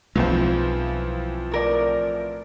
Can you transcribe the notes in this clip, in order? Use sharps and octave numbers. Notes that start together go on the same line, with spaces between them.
B1 E3 F3 G#3 C4 F4
A2 A#4 D5